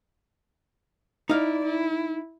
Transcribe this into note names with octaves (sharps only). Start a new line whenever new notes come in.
D#4 E4 D5 F5
E4